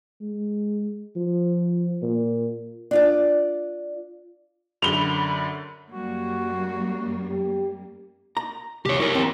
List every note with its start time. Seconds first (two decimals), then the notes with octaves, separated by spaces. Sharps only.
0.21 G#3
1.16 F3
2.02 A#2
2.91 D4 F4 D5
4.82 F#2 D3 B5 F7 G7
5.92 F#2 G3 A#3 F#4
7.30 G4
8.37 A#5
8.86 C2 G4 C#5
9.00 E4 G4 A#4 C#5 G#5
9.15 E3 B3 C4